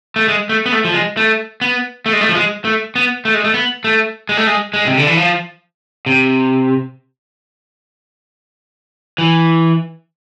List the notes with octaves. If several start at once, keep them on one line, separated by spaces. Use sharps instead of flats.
A3
G#3
A3
B3
A3
F3
G#3
A3
B3
A3
G#3
A3
F3
G#3
A3
B3
A3
G#3
A3
B3
A3
G#3
A3
G#3
G#3
C3
D3
E3
F3
C3
E3